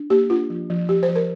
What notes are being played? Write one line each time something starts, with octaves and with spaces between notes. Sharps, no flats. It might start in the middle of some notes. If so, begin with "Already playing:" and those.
Already playing: D4
A#3 G4
D4 F4
F3
F3
F3 G4
C5
F3
A#4